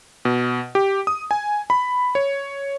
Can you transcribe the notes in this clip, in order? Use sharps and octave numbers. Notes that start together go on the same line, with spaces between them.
B2
G4
D#6
G#5
B5
C#5